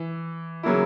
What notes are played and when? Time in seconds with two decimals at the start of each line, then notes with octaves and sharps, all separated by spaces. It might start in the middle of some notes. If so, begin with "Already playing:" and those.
Already playing: E3
0.63 C#3 F#3 A#3 E4